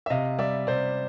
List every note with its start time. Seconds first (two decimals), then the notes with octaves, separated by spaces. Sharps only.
0.06 E5
0.10 C3 D#5 F5
0.39 G3 D5 E5
0.67 C3 C5 D5